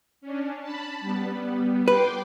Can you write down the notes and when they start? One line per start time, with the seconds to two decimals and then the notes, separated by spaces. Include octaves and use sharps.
0.21 C#4 D4
0.62 A5 B5
1.01 G3 B3
1.88 B4 G5 C6 D6